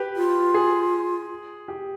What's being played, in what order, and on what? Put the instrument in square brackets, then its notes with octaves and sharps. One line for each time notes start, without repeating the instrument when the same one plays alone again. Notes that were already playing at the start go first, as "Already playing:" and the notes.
Already playing: [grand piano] G4 B4
[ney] F4
[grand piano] G#4
G4